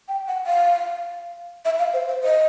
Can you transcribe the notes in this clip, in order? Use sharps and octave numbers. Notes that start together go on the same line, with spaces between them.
G5
F#5
F5
E5
F5
C5
C5
D#5